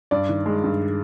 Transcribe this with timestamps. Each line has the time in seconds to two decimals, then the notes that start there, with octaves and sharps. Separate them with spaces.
0.11 G2 D5
0.29 D#3
0.46 G#3
0.64 G2